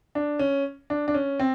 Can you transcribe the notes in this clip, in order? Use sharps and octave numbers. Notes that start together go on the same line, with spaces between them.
D4
C#4
D4
D4
C#4
C4